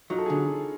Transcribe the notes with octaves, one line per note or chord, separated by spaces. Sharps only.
F#3 D#4 F4
A4
G#4
D3